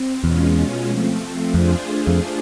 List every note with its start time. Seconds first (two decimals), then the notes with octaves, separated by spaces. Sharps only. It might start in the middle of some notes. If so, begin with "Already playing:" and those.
Already playing: C4
0.23 E2 B2 G#3 C#4 F4
0.88 F3 A3 C4
1.54 F2 A3 D4 F4 G#4 C5
2.07 F2